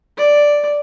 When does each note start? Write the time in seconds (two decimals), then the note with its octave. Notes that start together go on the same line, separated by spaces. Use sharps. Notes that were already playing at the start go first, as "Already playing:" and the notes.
0.18 D5